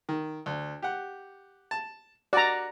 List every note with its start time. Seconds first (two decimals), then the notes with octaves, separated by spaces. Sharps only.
0.09 D#3
0.46 D2
0.82 G4 F#5
1.71 A5
2.33 F#4 D5 A#5